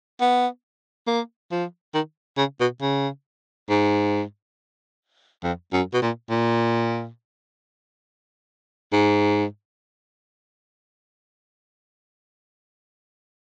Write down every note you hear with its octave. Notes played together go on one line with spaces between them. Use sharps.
B3
A#3
F3
D#3
C#3
B2
C#3
G#2
F2
F#2
B2
A#2
A#2
G#2